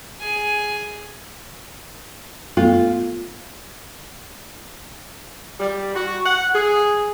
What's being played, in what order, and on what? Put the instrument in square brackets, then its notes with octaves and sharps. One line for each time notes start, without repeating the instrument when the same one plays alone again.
[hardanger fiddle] G#4 G#5
[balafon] A3 B3 A4 [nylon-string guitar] F4
[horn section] G3
F#4
F#5
G#4